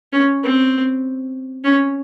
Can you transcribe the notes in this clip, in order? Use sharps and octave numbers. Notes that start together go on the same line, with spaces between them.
C#4
C4
C#4